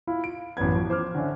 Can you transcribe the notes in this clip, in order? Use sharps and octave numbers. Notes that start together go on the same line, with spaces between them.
E4 F4 F5
D7
A1 F#2 E3 B3 G#6
E3 F3
C5 D6 F6
D3 C#4 E5